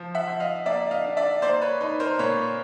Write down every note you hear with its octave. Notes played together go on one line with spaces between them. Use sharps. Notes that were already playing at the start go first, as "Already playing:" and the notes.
Already playing: F3
E5 F#5
F3
D#5 F5
A#3 D5 E5
D#5 F5
D4
D5 E5
A#3 C5 D5
B4 C#5
D#4 B4
A#4 C5
A#2 B4 C#5